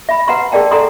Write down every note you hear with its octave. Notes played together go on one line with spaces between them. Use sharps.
E5 B5
B4 F#5 A#5 C6
G#4 A#4 D5 G5 A5
A4 F#5 G#5 A#5 C6 D#6